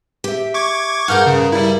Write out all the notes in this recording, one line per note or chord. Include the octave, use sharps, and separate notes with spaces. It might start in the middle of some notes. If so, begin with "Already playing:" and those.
G4 E5
C#6 D6 G#6
G2 G#4 A#4 F#5 F6 G6
C#3
G3 E4